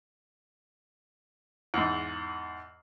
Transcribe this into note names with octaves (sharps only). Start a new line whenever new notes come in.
E2 G#2